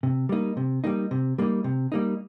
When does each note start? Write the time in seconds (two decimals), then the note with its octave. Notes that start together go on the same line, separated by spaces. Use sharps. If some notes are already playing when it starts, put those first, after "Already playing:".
0.03 C3
0.29 G3 A#3 D#4
0.57 C3
0.84 G3 A#3 D#4
1.11 C3
1.38 G3 A#3 D#4
1.64 C3
1.92 G3 A#3 D#4